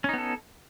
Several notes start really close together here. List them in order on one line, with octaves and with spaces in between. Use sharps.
C#4 D#4 B3 A4